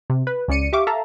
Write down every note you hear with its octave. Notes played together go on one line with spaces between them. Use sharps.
C3
B4
C#2 C#3 D5 C#7 D#7
G4 E5 F5 C#6 D6
A4 E5 F5 A5 A#5